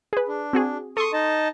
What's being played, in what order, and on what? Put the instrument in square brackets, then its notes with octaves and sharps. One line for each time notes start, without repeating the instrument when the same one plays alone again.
[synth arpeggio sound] G#4 B4
[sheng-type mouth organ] D4
[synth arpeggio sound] C4 F#4 G#4
[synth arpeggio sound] A4 C6 [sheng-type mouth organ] C#6 D#6
[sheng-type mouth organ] D#4 D#5 A5